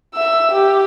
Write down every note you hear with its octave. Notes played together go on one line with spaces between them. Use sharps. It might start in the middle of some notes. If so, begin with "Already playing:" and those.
E5 E6
G4